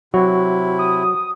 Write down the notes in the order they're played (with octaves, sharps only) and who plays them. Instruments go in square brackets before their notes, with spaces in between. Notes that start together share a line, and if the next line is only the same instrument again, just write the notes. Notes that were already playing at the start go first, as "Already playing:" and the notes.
[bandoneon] C3 E4 [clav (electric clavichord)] F#3 [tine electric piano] F#4
[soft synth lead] D#6